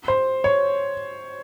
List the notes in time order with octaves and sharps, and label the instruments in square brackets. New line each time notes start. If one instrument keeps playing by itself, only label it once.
[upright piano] C5
C#5